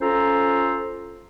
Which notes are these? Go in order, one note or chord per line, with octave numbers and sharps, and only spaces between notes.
C#4 F4 A4 C5 A#5